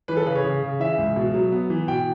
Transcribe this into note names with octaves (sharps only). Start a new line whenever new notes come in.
E3 B4
A4
C#3 B4
C#5
C#3
C#3
E3 E5
C#2
B2
F#3
B3
E3
B2 G5